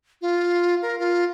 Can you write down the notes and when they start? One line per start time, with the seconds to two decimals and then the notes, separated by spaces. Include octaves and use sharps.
0.22 F4
0.82 A#4
0.99 F4